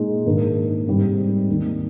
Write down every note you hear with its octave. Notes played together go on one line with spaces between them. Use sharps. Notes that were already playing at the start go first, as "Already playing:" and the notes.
Already playing: A#2 G#3 D#4
G#2 D#3 A#3 D4
G#2 G3 C4 D#4
D#2 D#3 G3